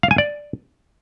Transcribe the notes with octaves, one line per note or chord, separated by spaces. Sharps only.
F5
G#5
D5